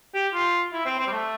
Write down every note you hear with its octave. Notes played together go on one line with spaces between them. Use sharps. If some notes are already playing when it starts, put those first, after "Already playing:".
G4
F4
E4
C4
C4
G3
A3